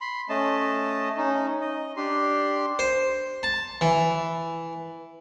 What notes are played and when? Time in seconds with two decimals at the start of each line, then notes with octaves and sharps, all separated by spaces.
0.01 B5 C6
0.29 A3 C#4 D#5 A5
1.17 C#4 D#4
1.61 D#5
1.97 D4 G4 C6
2.79 C5
3.43 A5
3.81 E3